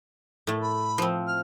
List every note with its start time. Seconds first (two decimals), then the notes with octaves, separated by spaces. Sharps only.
0.47 A2 A3
0.62 B5
0.98 F3 C4
1.27 F6